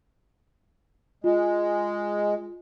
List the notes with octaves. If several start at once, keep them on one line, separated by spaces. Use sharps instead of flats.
G#3 F4